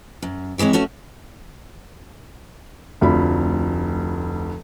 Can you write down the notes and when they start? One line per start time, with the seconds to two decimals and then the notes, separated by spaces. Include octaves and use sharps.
0.22 F#2
0.58 D#3 E3 G#3 C4 C#5
0.73 A3 C#4 F#4 E5
3.01 F1 D2 F3 B5